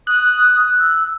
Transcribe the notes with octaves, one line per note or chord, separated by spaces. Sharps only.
D#6 F#6
E6